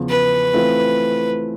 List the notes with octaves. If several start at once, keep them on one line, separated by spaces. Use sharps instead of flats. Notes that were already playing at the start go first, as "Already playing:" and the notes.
Already playing: E2 C#3 F3
B4
E3 A3 C4 F4